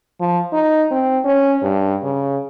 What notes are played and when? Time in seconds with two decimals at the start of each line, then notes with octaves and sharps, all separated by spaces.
0.21 F3
0.53 D#4
0.91 C4
1.25 C#4
1.63 G2
2.03 C#3